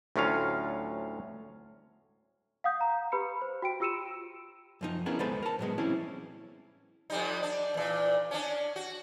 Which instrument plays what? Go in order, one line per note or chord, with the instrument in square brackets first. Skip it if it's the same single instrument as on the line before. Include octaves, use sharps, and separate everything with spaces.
[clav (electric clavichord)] D2 A2 F#3 C#4 F4 F5
[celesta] F5 F#5 D#6 G6
A#5
G4 B4 B5 C#7
C5
F#4 G5 D7
F4 G4 E6 C#7 D#7 E7
[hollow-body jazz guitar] F#2 F3 D#4
B3 C#4 D4 E4 G#4 A#4
C#2 G#3 B3 A4 C5 B5
A#4 A5
A2 F#3 G#3 B3
E3 F#3 G3 C4 C#4 E4
[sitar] F2 G3 D#4
D4
E2 A#2
C#4 D4
F#4